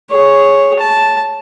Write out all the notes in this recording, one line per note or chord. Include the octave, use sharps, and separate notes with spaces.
G#4 C#5
A5